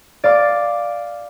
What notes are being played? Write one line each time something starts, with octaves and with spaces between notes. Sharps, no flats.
D5 F5 D6